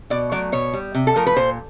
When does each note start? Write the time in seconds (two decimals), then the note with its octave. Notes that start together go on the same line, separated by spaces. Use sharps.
0.10 B2 D5
0.32 F#3 D5
0.35 A3
0.52 B2 C#5
0.73 G3
0.95 C3
1.07 A4
1.16 F3 A3 A#4
1.27 B4
1.36 A#2 C5